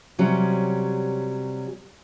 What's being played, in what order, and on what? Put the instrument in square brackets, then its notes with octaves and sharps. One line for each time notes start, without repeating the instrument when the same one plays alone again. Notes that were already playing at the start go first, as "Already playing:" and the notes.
[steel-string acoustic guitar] C3 F#3 G3 C#4